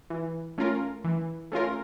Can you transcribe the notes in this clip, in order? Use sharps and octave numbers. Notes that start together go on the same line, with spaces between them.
E3
A3 C#4 F4 A#4
E3
A3 C#4 F4 A#4